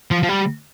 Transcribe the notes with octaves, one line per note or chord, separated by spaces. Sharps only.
F3
F3
G3